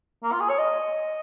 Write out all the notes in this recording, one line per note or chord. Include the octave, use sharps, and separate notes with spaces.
A#3
F4
G#4
C#5
D#5